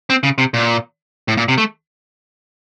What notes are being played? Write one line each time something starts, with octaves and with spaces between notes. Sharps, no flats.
C4
C#3
C3
A#2
A2
A#2
C3
A3